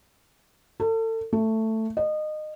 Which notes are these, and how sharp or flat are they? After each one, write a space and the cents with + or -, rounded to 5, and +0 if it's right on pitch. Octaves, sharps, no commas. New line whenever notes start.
A4 +35
A3 +10
D#5 -25